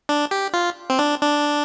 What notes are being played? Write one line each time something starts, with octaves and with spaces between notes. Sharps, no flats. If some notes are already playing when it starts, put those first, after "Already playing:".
D4
G4
F4
C4
D4
D4